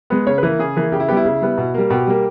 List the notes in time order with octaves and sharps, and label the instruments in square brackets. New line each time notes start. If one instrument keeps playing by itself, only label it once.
[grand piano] G#3 B3
C#3 C#5
B4
E3 A#3
C#3 G#4
E3 A#3
C#3 G4
E4
B3 G4
G3
E4
C#3
G3 B3
B2
G3 A#3
B2 G4
G3 A#3